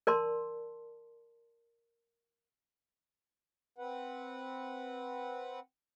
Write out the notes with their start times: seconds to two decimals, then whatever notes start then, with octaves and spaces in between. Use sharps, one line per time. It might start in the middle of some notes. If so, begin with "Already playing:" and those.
0.07 A#4 D5 A5 C6
3.78 C4 B4 F#5